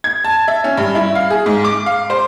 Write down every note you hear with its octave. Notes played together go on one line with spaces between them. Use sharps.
G#6
A5
E5
C#4
G2
E4
F5
G#4
G#2
D6
F5
C5